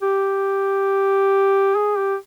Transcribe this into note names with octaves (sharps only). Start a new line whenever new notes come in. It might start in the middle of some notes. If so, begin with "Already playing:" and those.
G4
G#4
G4